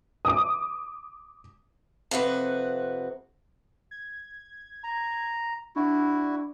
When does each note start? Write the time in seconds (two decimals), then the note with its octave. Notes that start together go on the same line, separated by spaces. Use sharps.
0.25 D6 D#6
2.11 F2 C3 F#4 B4
3.91 G#6
4.84 A#5
5.76 D4 E4 F#4